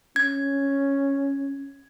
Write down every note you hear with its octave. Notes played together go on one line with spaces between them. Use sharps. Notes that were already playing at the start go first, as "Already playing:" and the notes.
C#4 G#6